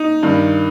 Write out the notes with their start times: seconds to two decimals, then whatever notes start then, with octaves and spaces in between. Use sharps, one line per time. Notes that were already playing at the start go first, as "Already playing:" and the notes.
Already playing: D#4
0.23 G2 D#3